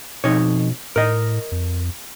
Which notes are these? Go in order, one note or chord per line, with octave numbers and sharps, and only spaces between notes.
F2 B2 D#4 C#5
A2 A#4 D#5
F2